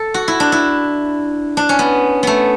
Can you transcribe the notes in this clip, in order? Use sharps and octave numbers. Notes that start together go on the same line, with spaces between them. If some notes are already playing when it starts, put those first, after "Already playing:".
Already playing: A4
F#4
E4
D4
E4
D4
C#4
B3
A3 B3